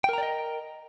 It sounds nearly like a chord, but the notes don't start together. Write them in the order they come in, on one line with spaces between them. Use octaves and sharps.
G5 A#4 A#5 D5 D#5